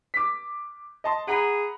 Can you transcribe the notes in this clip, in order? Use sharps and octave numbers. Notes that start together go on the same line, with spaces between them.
D6 B6
D#5 A5 C6
G#4 F#5 A#5 B5